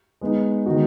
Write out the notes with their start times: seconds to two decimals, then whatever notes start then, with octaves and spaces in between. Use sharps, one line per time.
0.21 G#3 B3 D#4
0.66 D#3 G#3 B3 D#4 F#4